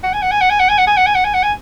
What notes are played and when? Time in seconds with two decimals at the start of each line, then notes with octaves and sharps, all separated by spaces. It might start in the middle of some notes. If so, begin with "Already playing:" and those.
0.03 F#5
0.13 G#5
0.22 F#5
0.31 G#5
0.41 F#5
0.50 G#5
0.60 F#5
0.69 G#5
0.78 F#5
0.87 G#5
0.97 F#5
1.06 G#5
1.15 F#5
1.25 G#5
1.34 F#5
1.43 G#5